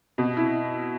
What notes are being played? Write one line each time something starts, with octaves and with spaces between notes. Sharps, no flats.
B2
E4